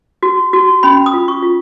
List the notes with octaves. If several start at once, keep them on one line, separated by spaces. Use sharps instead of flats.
F#4
F#4
C#4 B5
D#6
F4
C#6
F4